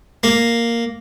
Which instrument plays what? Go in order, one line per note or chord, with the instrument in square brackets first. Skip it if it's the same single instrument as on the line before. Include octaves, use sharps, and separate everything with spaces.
[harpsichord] A#3